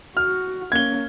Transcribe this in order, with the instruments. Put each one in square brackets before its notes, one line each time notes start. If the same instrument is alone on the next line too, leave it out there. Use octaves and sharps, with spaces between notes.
[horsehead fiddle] F#4 [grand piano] F6
[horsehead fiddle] A#3 C#4 [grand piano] G#6 G7